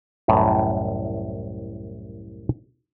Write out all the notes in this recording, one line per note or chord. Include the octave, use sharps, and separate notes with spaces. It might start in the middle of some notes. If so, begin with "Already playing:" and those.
C2 F#2 A2 D#5 A#5